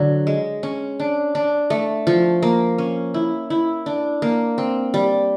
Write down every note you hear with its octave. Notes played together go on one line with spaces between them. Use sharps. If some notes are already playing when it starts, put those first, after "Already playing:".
Already playing: D3 F#3
G#3
C#4
D4
D4
A3
F3
A#3
C#4
E4
E4
D4
A#3
C4
G3